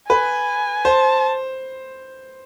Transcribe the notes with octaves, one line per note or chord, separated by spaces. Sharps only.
B4 G#5
C5 A5